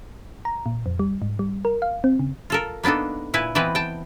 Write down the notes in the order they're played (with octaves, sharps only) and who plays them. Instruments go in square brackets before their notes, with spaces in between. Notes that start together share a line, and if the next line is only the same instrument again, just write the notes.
[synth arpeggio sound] A#5
A#2
F2
G3
G#2
G3
A#4
F5
C4
C#3
[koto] F4 A4 A#4
A#3 B3 D4 D#4 A4
A#2 E4 B4 G#5
E3 B3 C4 B4 D#5
G5 A5